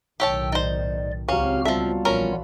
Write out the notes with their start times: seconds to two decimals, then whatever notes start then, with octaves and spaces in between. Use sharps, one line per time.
0.20 B1 A2 D#3 G4 C#5 G5 A5 E6
0.52 D#4 C5 D5
1.29 C#2 F#3 C4 C#4 F#4 G4 F5 F6
1.65 F3 G3 B3 F4 A4 E5
2.05 A#1 E3 C#4 A#4 B5